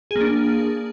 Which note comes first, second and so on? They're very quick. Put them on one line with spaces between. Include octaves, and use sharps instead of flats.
G#4 A#3 D4